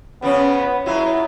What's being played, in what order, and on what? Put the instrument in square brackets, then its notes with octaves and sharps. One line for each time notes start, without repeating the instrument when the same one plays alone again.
[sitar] C#3 F3 C#4 [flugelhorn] B3
[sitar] F#3 G#3 F4 [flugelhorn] E4